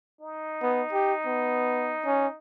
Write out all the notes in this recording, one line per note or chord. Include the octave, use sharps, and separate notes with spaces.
D#4
B3
G4
B3
C#4